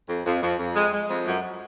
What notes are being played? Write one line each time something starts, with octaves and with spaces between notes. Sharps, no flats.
F2
F2
F2
F2
G#3
G#3
F2
F#2